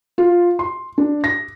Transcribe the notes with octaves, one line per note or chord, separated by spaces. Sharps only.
F4
C6
D4
A#6